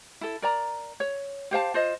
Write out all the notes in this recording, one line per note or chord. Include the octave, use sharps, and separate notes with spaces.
E4 A4
A#4 D5 A#5
C#5
G4 C5 F5 A5
F4 C5 D#5